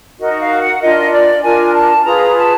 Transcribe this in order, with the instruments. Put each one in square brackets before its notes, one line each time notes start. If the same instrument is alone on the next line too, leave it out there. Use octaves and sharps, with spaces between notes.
[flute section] D#4 F#4 A#4 D#5
F5
F#5
D4 F4 A#4 D#5
D5
D4 F4 A#4 G#5
A5
F4 G#4 B4 A#5
A5